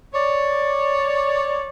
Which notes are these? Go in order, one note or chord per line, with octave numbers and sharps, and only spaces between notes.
C#5 D5